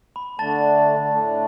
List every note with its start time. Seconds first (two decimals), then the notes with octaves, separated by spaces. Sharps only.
0.16 B5
0.39 D3 A3 D4 A5 A6
1.09 A2 A3 D4